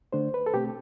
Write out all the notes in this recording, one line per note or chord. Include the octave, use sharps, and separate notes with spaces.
D3 A3 D4 C5
B4
A4
B2 A3 C4 G4